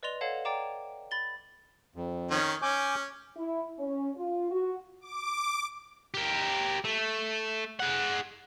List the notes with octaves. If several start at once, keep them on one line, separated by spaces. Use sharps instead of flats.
B4 D5 D#5 C6 F7 G7
A4 C#5 F5 F#5 A5
D5 G5 A#5 D6 E7
B5 A6 G7
F2
D#3 C#4
C#4 G#5 D6 G6
E4
C#4
F4
F#4
D6
G4 A#4
A3
G#4 F#5